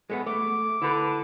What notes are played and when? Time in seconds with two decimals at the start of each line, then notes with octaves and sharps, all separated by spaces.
0.10 G#3 A3 B3
0.27 A3 D6
0.82 D3 E4 B4